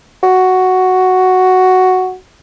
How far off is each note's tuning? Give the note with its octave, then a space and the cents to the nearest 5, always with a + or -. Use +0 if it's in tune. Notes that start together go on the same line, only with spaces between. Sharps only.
F#4 +5